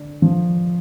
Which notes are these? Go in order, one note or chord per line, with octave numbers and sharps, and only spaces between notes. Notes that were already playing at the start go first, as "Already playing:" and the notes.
Already playing: D3 D4
F3